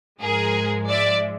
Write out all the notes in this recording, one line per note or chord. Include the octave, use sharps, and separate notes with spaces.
G#2 F3 G#3 G#4 A#4
D5 E5